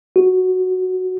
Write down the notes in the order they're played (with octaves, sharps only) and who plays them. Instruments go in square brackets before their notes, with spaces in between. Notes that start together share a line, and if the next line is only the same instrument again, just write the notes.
[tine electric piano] F#4